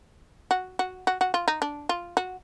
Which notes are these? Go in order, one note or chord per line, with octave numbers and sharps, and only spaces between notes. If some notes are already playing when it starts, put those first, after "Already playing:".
F#4
F#4
F#4
F#4
F4
D#4
D4
F4
F#4